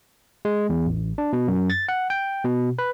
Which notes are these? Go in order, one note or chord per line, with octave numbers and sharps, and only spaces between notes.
G#3
E2
A1
D4
B2
F#2
A6
F#5
G5
B2
B4